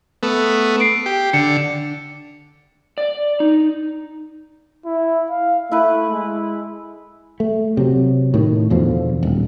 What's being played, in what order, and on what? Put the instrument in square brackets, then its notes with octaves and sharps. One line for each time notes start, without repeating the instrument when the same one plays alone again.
[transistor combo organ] A3 B3
[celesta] C7 D7
[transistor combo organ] G4
[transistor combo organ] D3 [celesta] C#7
[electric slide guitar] D5
D#4
[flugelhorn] E4
F5
[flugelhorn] A3 [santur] E4 B4
[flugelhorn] G#3
[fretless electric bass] A3
C3 F#3
A2 D#3
E2 B2 D3 F3
D#1